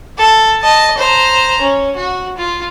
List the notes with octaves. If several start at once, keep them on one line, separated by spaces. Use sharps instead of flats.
A4
D#5 A5
C5 A#5
C#4
F#4
F4